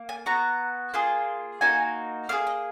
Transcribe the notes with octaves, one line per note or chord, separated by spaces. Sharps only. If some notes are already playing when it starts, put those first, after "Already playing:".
Already playing: A#3
G#5
B3 F#4 A#5
A#3 F4 G#4
A#3 D#4 F#4 G#5
A#3 F4 G#4 F5
D#5